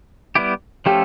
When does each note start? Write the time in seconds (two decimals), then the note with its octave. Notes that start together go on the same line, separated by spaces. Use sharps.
0.35 G3 B3 E4 G4
0.86 F3 A3 C#4 F4 G4 A4